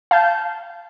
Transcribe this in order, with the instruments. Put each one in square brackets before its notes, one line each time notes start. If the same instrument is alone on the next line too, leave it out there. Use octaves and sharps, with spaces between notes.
[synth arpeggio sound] F5 A5 G6